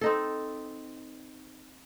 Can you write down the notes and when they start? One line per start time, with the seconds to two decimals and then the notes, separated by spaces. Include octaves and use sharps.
0.01 C4 D#4 A4